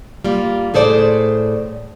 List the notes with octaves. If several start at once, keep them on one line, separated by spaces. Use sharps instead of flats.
G3 A#3 F4
A2 G#4 A4 C5 D5